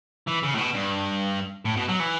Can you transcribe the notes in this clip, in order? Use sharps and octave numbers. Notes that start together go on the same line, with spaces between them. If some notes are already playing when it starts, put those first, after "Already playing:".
E3
C#3
A2
B2
G2
A2
B2
F#3
E3